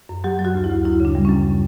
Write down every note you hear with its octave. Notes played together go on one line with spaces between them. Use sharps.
F#2
F#3 G4
F#3
F#4
D2
E4
D2
F#2 E4
C#3 D4
G3
F#2 C#4